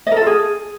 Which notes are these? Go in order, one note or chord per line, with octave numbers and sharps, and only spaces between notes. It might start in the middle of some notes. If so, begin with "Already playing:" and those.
D#5
A#4
A4
F4
G#4